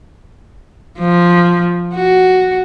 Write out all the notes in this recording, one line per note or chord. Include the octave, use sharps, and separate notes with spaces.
F3
F#4